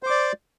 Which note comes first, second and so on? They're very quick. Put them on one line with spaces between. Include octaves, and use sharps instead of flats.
C5 D6 D5